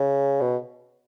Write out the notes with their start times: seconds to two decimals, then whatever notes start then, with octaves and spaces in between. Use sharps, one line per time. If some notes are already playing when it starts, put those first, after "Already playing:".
Already playing: C#3
0.41 B2